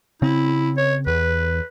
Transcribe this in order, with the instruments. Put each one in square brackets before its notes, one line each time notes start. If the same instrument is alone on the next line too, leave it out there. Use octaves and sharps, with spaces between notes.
[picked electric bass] C#3 C4 [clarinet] E4
[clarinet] C#5
[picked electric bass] E2 [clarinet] B4